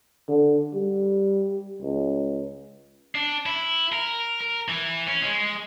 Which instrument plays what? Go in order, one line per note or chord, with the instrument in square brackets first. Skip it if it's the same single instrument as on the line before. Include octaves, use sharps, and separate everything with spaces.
[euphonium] D3
G3
C#2
[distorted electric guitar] D4
E4
A#4
A#4
E3
C#4
G#3